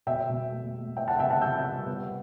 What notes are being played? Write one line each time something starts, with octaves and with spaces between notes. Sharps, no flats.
B2 E5 G5
B2
A3
A3
B3 E5 G5
F#5 A5
C3 E5 G5
F#5 A5
C3 E6 G6
G3
B3